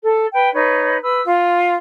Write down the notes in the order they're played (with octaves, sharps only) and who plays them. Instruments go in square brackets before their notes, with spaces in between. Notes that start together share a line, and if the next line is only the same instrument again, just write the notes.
[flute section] A4
B4 G5
D#4 B4 C#5
B4 E6
F4